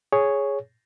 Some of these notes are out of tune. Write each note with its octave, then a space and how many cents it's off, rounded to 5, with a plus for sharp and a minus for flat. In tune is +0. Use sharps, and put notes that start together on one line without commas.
G#4 +0 C#5 +0